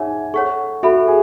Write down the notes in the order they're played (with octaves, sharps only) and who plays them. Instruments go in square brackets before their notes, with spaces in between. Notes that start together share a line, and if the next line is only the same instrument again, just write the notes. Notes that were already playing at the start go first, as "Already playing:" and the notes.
Already playing: [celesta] D#4 G#4 C#5 F#5 [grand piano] E5 G#5
[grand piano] A4 [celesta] C#5 F#5 C#6
[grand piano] F#4 [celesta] A4 E5 B5
[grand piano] G#4